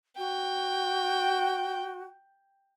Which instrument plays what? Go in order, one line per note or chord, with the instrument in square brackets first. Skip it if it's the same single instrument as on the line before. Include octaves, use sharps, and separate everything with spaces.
[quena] F#4 [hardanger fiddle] G5